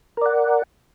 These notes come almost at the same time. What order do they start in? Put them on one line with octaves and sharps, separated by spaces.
A#4 D5 F#5